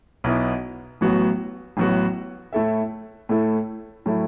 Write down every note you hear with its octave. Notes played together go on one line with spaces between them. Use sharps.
B1 B2 B3 E4
A1 A2 F#3 B3 F#4
A1 A2 F#3 B3 F#4
A2 A3 E4 A4 E5
A2 A3 E4 A4 E5
A2 F#3 A3 E4 A4